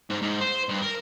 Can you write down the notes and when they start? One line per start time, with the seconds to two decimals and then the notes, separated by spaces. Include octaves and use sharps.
0.10 G#2
0.22 G#2
0.41 C5
0.69 G2
0.82 A#4